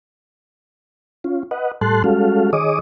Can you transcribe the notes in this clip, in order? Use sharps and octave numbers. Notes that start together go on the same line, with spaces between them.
C#4 F4
B4 D#5 F#5
A2 G3 A4 A5 C6 F#6
G3 G#3 C#4 F#4 A4 F5
D#3 G#4 C#5 D#5 D6 D#6